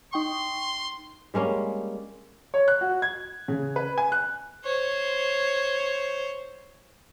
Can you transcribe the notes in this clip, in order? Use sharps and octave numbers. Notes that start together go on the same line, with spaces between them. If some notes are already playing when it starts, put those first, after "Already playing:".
D#4 G5 C6 C#6
G3 G#3 A#3 C#4
C#5
F#6
F#4
G#6
C#3
B4
G#5
F#6
C5 C#5